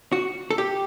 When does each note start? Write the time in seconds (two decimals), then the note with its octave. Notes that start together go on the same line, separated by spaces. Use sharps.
0.12 F#4
0.50 A4
0.58 G4